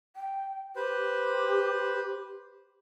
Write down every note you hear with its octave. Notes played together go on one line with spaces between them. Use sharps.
G5
G4 B4 C5